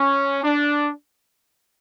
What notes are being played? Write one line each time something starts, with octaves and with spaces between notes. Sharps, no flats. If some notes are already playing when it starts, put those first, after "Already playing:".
Already playing: C#4
D4